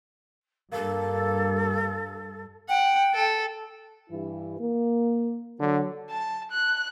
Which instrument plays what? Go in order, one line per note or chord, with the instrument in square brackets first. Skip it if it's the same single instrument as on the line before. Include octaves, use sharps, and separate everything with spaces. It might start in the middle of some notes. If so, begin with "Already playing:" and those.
[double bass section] G2 [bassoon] A#3 [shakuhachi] A4
[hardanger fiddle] F#5 [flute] G5
[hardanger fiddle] A4
[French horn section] G2 E3 E4
A#3
[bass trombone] D3 [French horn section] F#3
[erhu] A5
F#6